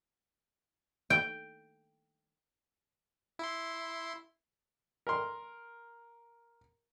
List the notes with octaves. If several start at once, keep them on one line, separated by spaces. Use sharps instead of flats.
G5
E4 C6
A#4 C6